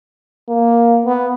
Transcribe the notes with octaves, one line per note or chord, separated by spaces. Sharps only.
A#3
B3